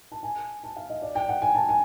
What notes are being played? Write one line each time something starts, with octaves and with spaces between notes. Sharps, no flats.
A5
G#5
A5
F5
D#5
D5
G5
F#5
G#5
A5
G#5